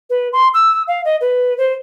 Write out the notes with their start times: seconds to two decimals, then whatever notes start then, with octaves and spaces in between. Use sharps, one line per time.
0.10 B4
0.33 C6
0.54 E6
0.88 F5
1.05 D#5
1.21 B4
1.58 C5